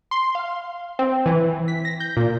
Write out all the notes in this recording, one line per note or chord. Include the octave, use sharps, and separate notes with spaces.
C6
F5
C4
E3
B6
A#6
G6
A#2